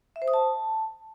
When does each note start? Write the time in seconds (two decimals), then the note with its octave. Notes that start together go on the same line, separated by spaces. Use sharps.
0.16 E5
0.22 C5
0.28 D#6
0.34 A5